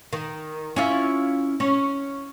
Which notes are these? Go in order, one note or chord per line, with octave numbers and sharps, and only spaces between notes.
D#3
C#4 E4 F4
C#4